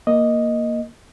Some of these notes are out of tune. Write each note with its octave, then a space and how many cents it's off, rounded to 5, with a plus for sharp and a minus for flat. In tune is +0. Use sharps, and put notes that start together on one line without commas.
A#3 +0 D#5 +0